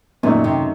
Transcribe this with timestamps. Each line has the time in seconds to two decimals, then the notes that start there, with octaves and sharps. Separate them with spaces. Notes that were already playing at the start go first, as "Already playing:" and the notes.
0.23 F#2 A#2 D#3 F#3 A3
0.44 C3